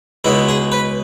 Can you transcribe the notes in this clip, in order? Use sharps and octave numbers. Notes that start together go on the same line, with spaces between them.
C#2 B2 G#3 E4
G#4
B4